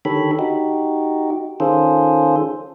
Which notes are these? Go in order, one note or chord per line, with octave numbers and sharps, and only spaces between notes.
D3 D#3 G4 A4 C#5 B5
D#4 F#4 G4
D#3 C#4 F4 G#4 A4 C5